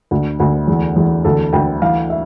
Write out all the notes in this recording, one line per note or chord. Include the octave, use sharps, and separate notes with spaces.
D2
D2
E2
E2
D2 A4
D2 G5
E3 F5
E5